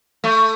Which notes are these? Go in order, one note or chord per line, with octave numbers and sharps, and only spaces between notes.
A3